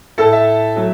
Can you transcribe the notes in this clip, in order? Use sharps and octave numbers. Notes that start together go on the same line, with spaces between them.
A2 A3 A4 A5
E5
F#3 A3